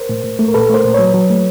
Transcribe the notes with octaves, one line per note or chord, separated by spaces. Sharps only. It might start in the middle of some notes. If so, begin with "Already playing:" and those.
Already playing: A#4 C5
A2
A2
A3
A#4
A#2 A4 B4
A3 A#4 C5
A#2
F#3 B4 C#5
F#3
A3